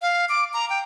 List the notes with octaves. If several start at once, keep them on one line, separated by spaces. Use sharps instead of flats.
F5
D6
A#5
G5